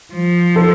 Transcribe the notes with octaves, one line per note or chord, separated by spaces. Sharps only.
F3
A4